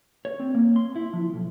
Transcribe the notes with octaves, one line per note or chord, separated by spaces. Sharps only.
C#5
C4
A#3
C6
E4
F3
B1